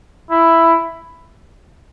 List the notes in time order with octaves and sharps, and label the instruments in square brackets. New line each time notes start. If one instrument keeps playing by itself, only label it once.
[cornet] E4